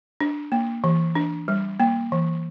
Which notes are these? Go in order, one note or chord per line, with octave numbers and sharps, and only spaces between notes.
D4
A#3
E3
D4
G3
A#3
E3